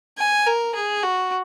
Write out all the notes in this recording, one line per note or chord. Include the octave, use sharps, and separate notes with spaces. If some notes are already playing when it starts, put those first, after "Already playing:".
G#5
A#4
G#4
F#4